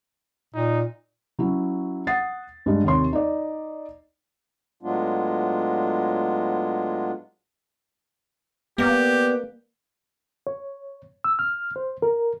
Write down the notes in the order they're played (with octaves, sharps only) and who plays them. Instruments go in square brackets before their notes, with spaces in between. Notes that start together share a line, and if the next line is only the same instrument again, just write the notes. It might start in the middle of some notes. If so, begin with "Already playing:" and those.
[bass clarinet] A#2 [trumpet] D#4
[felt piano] F#3 C#4 E4
F#5 D#6 A6 C7
G2 G#3
D#2 C3 C#5 C6
D#4 D5
[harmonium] A2 F#3 G#3 B3 D4 F4
[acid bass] A#3 [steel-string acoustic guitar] B3 D5 [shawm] G4
[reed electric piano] C#5
E6
F6
C5
A#4